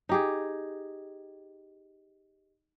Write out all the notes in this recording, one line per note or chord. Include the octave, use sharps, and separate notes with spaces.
D#4 G4 G#4